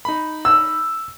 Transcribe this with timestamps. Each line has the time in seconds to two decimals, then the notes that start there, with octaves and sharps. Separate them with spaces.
0.05 D#4 B5
0.45 E6